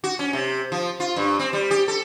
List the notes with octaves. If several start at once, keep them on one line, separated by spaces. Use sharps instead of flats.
F#4
C#4
C3
F3
F4
G2
C4
G3
G4
A4